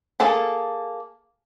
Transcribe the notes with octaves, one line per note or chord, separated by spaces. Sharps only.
A#3 G#4 A4 A5